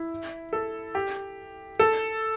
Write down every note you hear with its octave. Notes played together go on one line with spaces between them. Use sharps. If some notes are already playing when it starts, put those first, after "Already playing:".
Already playing: E4
A4
G4
A4